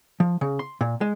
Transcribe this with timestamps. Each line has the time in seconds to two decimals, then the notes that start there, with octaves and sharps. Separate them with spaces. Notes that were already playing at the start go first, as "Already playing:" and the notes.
0.20 F3
0.41 C#3
0.59 C6
0.81 A#2
1.01 G#3